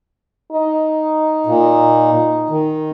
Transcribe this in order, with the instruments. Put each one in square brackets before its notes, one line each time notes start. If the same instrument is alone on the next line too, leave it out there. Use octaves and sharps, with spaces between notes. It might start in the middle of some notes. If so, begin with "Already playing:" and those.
[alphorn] D#4
[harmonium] A#2
D#3